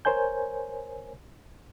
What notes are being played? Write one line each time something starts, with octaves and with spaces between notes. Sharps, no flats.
A#4 C5 C#5 G#5 G6